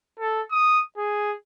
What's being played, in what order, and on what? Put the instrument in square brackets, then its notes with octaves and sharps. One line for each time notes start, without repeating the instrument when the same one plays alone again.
[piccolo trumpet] A4
D#6
G#4